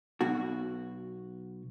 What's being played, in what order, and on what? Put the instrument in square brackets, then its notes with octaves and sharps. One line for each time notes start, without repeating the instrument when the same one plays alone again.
[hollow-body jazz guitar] B1 B2 F#4